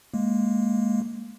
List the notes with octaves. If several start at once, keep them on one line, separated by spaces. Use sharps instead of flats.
G#3 A#3